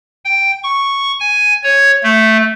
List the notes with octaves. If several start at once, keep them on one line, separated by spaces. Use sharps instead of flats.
G5
C#6
G#5
C#5
A3